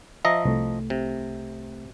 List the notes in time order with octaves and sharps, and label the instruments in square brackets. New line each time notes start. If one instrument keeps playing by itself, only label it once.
[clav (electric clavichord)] F3 D#5 A#5 [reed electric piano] E5
[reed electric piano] C2 A3
[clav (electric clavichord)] C3